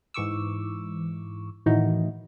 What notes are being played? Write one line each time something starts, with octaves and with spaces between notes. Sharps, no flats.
G#2 E3 C#6 D6 E6
A2 D#3 E3 D#4 E4 F#4